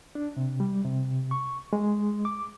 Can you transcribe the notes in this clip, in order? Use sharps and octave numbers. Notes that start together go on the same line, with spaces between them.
D4
C3
G3
C3
C#6
G#3
D6